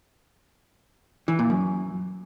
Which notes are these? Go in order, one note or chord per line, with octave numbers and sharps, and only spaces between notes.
E3
A#2
F#2